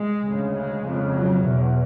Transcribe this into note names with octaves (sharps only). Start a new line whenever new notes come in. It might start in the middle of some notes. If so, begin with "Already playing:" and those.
Already playing: G#3
D2 C#3
G#3
F2 C#3
F#3
E2 B2